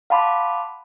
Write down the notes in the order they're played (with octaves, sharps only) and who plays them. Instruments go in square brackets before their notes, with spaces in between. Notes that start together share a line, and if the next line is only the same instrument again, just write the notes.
[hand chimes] F5 F#5 A5 B5 C6 D6